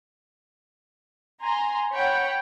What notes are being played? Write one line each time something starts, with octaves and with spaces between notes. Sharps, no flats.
G#5 A#5 C6
C#5 F#5 G5 B5